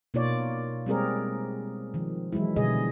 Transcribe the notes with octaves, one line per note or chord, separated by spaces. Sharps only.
B2 A#3 D#4 F4 C#5 D5
G3 G#3 C4 G#4 A#4 D5
D#3 F3
E3 F#3 G#3 E4
B2 D3 G3 G#4 D#5